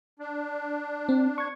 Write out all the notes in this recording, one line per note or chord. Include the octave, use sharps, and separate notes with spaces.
D4
C4
C#6 G#6